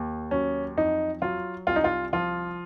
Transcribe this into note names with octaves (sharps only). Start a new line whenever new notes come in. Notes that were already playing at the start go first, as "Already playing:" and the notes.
Already playing: D#2
F#3 C#4
F2 D#4
F#3 F4
C2 F4
D#4
F4
F3 F4